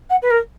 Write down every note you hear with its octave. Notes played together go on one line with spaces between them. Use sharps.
F#5
B4
A#4